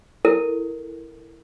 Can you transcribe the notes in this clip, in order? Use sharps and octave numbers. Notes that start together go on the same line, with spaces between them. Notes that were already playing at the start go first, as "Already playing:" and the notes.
E4 A4 A#4